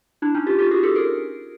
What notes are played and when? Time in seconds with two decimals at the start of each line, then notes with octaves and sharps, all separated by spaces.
0.22 D4 E4
0.34 C#4 D#4
0.47 F4 G4
0.58 F4 G4
0.71 F#4 G#4
0.83 G4 A4
0.95 G#4 A#4